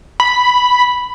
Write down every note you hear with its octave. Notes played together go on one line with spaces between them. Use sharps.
B5